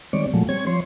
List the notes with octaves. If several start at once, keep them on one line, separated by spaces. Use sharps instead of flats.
D#3 G3 G#3 C4 C#5 D5
A#2 F3 F#3 G#3 A3
G3 C4 C#5 G#6
F3 C#5 C6